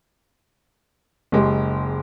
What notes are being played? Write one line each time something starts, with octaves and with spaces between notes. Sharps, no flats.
F#1 G#3 G4